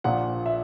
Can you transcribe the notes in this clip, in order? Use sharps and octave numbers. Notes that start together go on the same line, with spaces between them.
A#1 A#2 F#5
E5